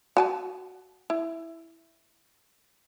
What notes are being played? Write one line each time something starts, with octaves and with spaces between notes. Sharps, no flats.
F#4 G#5 A5
E4